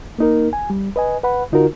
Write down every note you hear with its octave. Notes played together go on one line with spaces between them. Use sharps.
A#3 D#4 A#4
G#5
G3
B4 D#5 G#5
B4 F#5 B5
D3 D#4 F4 F#4 A#4